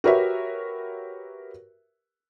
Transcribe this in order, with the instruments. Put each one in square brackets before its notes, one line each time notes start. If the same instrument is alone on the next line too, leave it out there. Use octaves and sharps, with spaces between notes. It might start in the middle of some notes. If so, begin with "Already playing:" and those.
[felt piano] F#4 G4 A#4 B4 C#5 E5